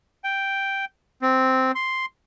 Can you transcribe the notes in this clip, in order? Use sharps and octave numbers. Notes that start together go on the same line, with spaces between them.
G5
C4
C6